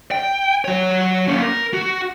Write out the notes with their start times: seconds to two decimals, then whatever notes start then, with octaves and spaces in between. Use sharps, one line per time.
0.12 G5
0.65 F#3 C#5
1.28 A#3 C#4
1.42 A#4
1.74 F#4